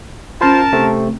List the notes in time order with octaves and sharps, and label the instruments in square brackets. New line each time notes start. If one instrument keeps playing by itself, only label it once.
[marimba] C#4 B5 [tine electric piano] F4 C5 F5 [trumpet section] A#4 A5
[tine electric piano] C3 A3 C4